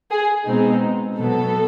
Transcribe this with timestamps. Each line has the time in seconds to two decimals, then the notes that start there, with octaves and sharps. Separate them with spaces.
0.11 G#4
0.47 B2 G#3 C4 D#4
1.19 B2 F#3 B3 A4